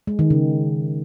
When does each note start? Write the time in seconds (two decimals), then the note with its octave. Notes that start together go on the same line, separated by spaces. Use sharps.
0.07 G#3
0.19 D#3
0.30 C#3